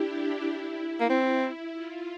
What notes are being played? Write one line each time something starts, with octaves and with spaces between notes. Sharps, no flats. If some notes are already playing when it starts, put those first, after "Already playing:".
Already playing: D4 E4 G4
E4
A#3
C4
F4